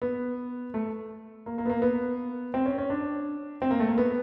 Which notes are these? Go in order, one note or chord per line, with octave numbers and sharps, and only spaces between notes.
B3
A3
A#3
A#3
B3
A#3
B3
C4
C#4
C#4
D4
C4
A#3
A3
A#3
B3